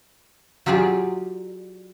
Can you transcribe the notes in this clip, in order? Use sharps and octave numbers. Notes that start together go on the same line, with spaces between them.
F#3 F4 G4 G#4 D5